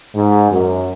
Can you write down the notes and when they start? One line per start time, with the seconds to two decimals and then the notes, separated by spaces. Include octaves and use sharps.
0.15 G#2
0.51 F#2